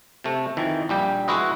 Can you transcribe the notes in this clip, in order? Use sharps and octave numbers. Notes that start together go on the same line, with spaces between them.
C3 A3
F2 D#3 E3
A#1 G3 G4
G#3 E4 F#4 B4 D#5